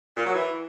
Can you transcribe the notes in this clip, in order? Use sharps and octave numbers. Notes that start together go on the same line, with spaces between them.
A#2
F#3
E3